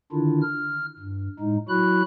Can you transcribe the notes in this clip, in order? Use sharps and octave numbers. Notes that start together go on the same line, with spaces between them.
D3 D#3 D4 E4 F4
F6
G2
A2 G#3 D#4
F#3 E4 F#4 B5 F#6